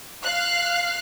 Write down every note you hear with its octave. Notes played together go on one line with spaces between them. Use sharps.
F5 F#6